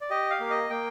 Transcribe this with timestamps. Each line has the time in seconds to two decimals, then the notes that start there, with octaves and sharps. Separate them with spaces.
0.01 D5
0.10 G4 D#5
0.30 F5
0.40 A#3
0.50 D#5
0.70 A#3 G5